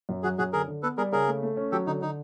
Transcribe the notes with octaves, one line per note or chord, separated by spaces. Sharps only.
F#2
F#3 F#4 G#4
F#2 F#4 G#4
D3 G#4 A#4
D3
B3 A4 B4
G3 G#4 A#4
C#3 G#4 A#4
A3
A3
C#4
F#3 G4 A4
D3 D#4
D3 D#4